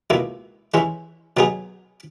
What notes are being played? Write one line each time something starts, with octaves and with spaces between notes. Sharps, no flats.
C#2 B2 A#3 E4
E3 G#3 C#4 E4
B2 F#3 B3 D#4 G#4